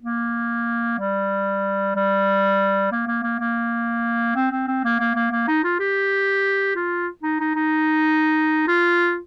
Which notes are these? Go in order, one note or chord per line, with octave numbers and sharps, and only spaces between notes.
A#3
G3
G3
A#3
A#3
A#3
A#3
C4
C4
C4
A#3
A#3
A#3
A#3
D#4
F4
G4
F4
D#4
D#4
D#4
F4